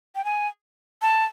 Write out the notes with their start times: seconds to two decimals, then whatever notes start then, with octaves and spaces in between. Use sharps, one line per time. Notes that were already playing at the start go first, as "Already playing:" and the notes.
0.15 G5
0.25 G#5
1.02 A5